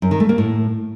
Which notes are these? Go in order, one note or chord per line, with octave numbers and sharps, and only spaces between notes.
F#2
D#3
A3
A#3
A2